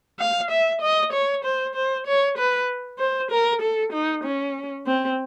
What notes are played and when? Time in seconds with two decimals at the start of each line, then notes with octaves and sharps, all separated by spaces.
0.19 F5
0.51 E5
0.82 D#5
1.13 C#5
1.44 C5
1.75 C5
2.07 C#5
2.38 B4
2.99 C5
3.31 A#4
3.62 A4
3.93 D#4
4.24 C#4
4.86 C4